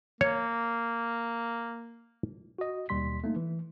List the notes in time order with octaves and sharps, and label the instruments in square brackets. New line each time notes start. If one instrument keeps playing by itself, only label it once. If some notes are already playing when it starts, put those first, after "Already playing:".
[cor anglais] A#3 [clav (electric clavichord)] C#5
[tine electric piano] F#4 D#5
D#2 B2 G3 C6 B6
A3 A#3 D#4
E3